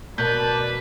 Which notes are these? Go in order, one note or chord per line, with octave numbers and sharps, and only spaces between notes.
B2 A#4 B4 D5 A5 G6